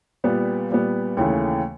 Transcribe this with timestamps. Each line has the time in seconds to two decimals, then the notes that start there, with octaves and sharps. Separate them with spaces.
0.24 A#2 G3 B3
0.70 A#2 G3 B3
1.17 D#2 C#3 E3 A3